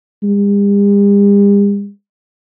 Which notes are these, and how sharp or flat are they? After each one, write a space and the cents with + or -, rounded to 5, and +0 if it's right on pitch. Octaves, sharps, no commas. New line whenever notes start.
G3 +45